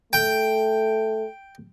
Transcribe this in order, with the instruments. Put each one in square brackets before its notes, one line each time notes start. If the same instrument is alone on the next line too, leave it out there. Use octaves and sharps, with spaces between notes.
[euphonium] A3 [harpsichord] G5